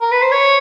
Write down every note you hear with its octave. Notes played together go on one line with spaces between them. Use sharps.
A#4
B4
C5
C#5